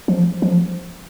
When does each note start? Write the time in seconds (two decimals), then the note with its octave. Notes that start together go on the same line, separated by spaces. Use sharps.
0.08 F3
0.42 F3